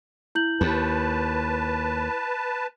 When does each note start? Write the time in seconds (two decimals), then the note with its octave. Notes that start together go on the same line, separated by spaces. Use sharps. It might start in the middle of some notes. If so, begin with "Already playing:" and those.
0.35 E4 G6 F#7
0.61 D#2 B4 A5